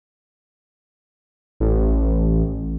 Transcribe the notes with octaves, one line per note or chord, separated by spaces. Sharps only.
A1